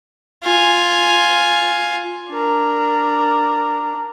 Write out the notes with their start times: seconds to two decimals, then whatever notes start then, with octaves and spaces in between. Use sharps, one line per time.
0.43 F4 G#5
2.30 D4 A#4